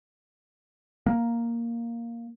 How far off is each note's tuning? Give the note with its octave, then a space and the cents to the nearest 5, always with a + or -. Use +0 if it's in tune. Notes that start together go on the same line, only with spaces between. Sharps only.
A#3 +0